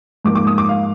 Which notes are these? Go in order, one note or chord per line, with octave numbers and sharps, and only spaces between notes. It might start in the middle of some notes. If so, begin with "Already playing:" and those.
G#2 F3 A#3 D6
D6
D#6
D6
F5